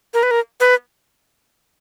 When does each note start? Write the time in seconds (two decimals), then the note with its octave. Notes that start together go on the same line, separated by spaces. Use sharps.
0.14 A#4
0.23 B4
0.31 A#4
0.60 B4